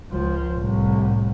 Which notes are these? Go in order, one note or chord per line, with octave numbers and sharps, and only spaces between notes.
C#2 F3
C2 A2